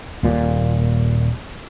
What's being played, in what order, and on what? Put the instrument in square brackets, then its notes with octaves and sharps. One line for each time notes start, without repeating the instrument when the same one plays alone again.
[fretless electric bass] D#1 A#2